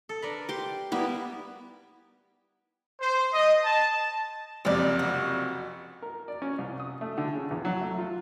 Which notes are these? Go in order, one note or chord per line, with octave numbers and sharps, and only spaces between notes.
A4
D4 A#4 B4
G4 C6
G3 A#3 B3 E4 G4 E5
C5
D#5
A5
F#1 F2 C3 C#4 D5
F#4
A#4
D5
C#4
C2
D#6
A3
D3
C#3
E2
F#3
A3
F4